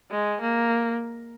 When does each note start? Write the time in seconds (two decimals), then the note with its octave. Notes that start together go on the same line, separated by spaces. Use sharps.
0.11 G#3
0.41 A#3